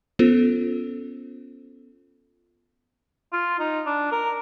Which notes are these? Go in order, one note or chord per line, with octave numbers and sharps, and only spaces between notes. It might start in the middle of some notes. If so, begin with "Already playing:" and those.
B3 C#4 F4 A4 C5
F4
D#4
D4
A#4